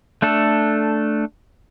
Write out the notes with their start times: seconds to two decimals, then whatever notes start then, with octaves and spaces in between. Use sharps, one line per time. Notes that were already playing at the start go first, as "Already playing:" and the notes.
0.22 A3 D4 A4